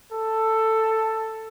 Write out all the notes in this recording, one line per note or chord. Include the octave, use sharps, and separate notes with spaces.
A4